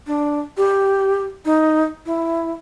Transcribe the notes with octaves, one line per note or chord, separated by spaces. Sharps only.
D4
G4
D#4
E4